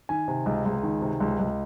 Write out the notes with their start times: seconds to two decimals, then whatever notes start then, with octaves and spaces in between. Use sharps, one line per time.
0.09 D#3 G#5
0.28 C3
0.46 C#2
0.66 C#2
0.83 D#3
1.02 C3
1.20 C#2
1.40 C#2